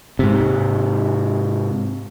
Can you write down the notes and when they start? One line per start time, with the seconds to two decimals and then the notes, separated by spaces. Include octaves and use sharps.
0.19 G#2 C3